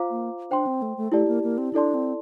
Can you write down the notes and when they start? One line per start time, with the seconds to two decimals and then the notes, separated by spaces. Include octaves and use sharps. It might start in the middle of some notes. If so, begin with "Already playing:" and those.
Already playing: F4 C5 F5 A#5 D6
0.10 A#3
0.50 D4 C5 G5 C6
0.67 C4
0.82 A3
0.97 A3
1.12 A3 E4 G4 D5 A5
1.28 A#3
1.43 A#3
1.58 C4
1.73 D4 E4 A4 D5 A5 C6
1.94 C4